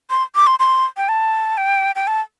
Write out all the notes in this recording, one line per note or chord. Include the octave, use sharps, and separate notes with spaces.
C6
D6
C6
C6
G5
A5
G5
G5
A5